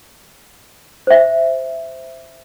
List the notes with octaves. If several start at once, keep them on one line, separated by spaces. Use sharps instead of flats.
C5 E5